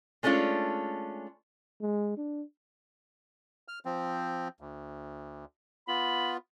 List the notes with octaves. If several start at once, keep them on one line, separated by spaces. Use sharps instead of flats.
G#3 A3 C#4 D4 F4
G#3
D4
F6
F3 C4
D2
B3 F4 B5